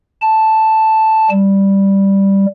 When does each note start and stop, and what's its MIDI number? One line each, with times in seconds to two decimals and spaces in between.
0.22 1.30 81
1.30 2.46 55